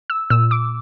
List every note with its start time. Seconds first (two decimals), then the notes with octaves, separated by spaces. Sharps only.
0.10 E6
0.30 A#2 E6
0.51 D6